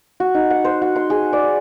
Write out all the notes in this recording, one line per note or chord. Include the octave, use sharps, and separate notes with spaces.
F#4
D#4
F#5
C5
F#4
C6
G#4
D5